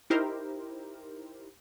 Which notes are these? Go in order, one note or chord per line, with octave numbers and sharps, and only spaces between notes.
D#4 E4 G4 A#4 C5